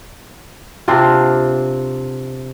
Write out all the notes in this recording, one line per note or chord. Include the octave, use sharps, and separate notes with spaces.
C3 C4 D4 F4